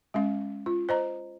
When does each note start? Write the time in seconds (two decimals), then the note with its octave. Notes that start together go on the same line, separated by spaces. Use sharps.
0.14 G#3 C#4 F5
0.66 F4
0.89 C5 D#5 A#5